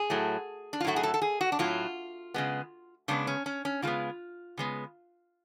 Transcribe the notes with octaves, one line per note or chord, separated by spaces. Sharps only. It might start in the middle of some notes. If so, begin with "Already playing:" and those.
Already playing: G#4
A2 F#3 A3
D4
F4
A2 F#3 A3 F#4
G#4
A4
A4
G#4
F#4
D4
A2 F#3 A3 F4
C#3 G#3 B3
C#3 G#3 B3 D4
C#4
C#4
C#4
C#3 G#3 B3 F4
C#3 G#3 B3